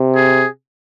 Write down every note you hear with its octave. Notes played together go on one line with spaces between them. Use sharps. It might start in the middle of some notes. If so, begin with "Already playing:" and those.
Already playing: C3
G#4